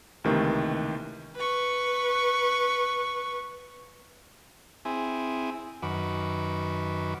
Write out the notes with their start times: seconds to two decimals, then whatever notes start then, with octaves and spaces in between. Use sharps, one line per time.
0.24 C#2 C3 D#3 E3 A3 A#3
1.36 B4 C#6
4.85 C4 E4 G#4 G#5
5.82 F#2 D#3 F#4 B4 D6